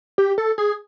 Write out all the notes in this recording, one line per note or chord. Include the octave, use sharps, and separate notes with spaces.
G4
A4
G#4